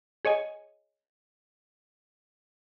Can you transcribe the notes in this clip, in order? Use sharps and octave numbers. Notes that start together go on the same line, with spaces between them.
G#4 C#5 D#5 G#5